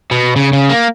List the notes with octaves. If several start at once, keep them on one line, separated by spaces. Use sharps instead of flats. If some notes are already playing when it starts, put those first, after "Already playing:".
B2
C#3
C#3
A#3